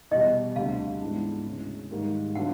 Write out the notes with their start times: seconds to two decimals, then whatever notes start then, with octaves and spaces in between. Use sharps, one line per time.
0.11 E2 B2 G3 D#5
0.56 D2 D3 G3 C4 F5
1.01 G#2 E3 G#3 B3 D4
1.46 D2 C#3 E3 G#3 C#4
1.91 G#2 D#3 G3 A#3
2.35 D3 F#3 B3 D4 F4 F#5